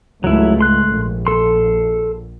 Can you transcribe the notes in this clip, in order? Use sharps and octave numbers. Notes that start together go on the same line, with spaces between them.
C#2 G#2 F#3 A3 E4
C6 F#6
A#1
A4 C6